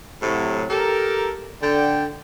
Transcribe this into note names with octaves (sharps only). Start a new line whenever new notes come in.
A2 C3 F#3
G4 A4 A#4
D3 G5